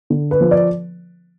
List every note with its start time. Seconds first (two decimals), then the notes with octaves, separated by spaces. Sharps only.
0.10 D3
0.31 B4
0.41 F3
0.51 D5